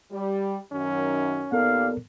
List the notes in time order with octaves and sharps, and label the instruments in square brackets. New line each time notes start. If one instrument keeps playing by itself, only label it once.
[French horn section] G3
[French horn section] F#2 D#3 [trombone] C#4
[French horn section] D#2 A#2 D5 [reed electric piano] B3 A4 A#4 [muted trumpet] F5